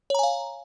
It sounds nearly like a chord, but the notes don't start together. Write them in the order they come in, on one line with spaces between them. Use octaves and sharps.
C#5 A#5 G#5 F5